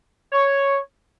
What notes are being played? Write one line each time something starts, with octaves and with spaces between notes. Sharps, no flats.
C#5